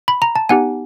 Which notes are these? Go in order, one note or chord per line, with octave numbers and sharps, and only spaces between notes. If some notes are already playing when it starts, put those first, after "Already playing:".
B5
A#5
A5
B3 D#4 G4 F#5 G#5